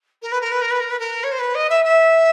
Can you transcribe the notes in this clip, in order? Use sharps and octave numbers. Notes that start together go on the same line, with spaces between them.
A#4
B4
A#4
B4
A#4
B4
A#4
B4
A#4
C#5
C5
B4
D#5
E5
E5